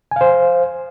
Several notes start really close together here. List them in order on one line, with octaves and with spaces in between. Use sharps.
G#5 F5 C5